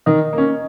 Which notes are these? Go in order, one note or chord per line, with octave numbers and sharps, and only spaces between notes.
D#3 D#5
A#3
C#4